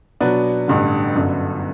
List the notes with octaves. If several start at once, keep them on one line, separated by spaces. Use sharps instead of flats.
B2 F#3 B3 D4
A1 G2 D3
G1 F#2 D3